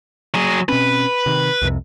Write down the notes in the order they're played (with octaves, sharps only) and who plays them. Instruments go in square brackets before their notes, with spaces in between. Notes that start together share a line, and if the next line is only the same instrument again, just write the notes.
[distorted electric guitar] F#3 G#4
[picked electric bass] B2 C4 C#4 [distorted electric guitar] B4
[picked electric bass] C3 D#3
C2 F2 C3